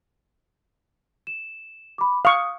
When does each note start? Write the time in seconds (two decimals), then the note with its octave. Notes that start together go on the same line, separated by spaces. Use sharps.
1.27 E7
1.98 B5 D6
2.25 F5 C#6 D#6